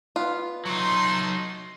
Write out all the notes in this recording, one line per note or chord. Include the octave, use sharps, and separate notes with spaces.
B3 F4
F#3 A3 D#4 C6